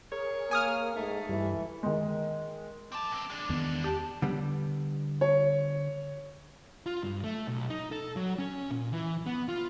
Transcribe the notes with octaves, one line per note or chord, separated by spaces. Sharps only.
G#4 A#4 C#5
A#3 G#5 D#6 F6
G#2 A3
G2 E3 G3
D#3 G#3
C4 A5 D6
G2 C4
G#3 D4
E2 D#3 B3
G4 A5
D3 G3 B3
C#5
F4
G2
A3
B1
D#4
A4
F#3
C#4
A#2
E3
B3
F4